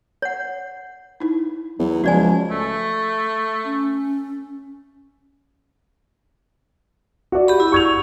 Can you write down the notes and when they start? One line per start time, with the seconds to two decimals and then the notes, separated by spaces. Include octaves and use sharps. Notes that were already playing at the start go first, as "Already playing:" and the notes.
0.22 C#5 F#5
1.20 D#4 E4
1.79 E2 F#3
2.04 C#2 F3 F#4 D5 G#5
2.51 A3
3.65 C#4
7.32 F#4 D5
7.48 G4 B5
7.60 E4
7.72 C#6 G#6 F7